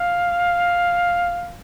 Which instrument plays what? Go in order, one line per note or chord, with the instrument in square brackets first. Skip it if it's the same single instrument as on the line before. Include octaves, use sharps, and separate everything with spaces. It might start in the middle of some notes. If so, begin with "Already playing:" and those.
Already playing: [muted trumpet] F5